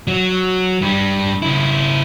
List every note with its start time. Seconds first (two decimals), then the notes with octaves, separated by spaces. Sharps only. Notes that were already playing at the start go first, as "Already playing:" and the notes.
0.07 F#3
0.82 G2 G3
1.42 C#3 E4